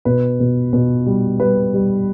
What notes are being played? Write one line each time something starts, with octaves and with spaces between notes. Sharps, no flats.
B2 B4
B2
B2
G3
G3 B4
G3